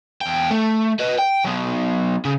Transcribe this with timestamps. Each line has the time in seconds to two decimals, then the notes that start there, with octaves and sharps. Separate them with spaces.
0.21 E2 G5
0.51 A3
1.00 B4 D#5
1.19 G5
1.45 F#3 B3
2.25 C#3